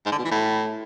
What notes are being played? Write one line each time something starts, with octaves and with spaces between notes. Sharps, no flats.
G#2
D3
B2
E3
A2